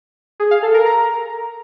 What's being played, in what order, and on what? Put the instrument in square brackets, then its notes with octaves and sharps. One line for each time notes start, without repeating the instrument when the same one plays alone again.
[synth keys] G#4
F5
A4
A#4
A#5